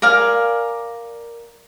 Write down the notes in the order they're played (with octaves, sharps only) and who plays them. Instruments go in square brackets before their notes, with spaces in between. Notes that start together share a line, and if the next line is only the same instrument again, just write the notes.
[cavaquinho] A#4 D5 F5 G#5